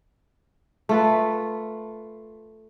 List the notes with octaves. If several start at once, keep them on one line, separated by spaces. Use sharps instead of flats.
A3 F4 B4